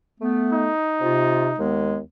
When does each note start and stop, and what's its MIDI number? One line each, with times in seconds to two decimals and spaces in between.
0.20 0.69 57
0.20 0.69 59
0.53 1.61 63
1.01 1.50 48
1.01 1.50 65
1.58 1.99 39
1.58 1.99 56
1.58 1.99 59